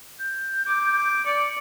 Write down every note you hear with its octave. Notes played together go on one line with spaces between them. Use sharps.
G6
D6
D5 C#7